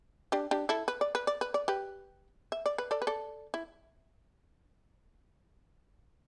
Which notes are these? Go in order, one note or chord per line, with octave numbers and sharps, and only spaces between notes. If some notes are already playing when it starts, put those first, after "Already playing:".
D4 G4
D4 G4
E4 A4
B4
D5
B4
D5
B4
D5
G4 B4
E5
D5
B4
A4 D5
B4
A4 D5
E4